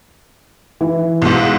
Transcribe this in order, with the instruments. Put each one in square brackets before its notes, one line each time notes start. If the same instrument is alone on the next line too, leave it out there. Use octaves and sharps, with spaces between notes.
[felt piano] E3
[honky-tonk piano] B1 G#2